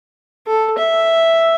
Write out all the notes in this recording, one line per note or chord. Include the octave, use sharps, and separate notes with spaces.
A4
E5